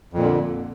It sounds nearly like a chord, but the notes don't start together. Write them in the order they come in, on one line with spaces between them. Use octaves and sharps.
F2 A#2 D3